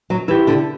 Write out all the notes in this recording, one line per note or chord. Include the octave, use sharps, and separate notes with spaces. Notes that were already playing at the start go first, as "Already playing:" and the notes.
F#3
E3 E4 G4
D3